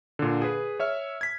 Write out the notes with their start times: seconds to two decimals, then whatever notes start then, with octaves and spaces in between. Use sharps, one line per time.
0.19 A#2 D3
0.42 G#4 B4
0.79 C#5 E5 F6
1.21 G#6 B6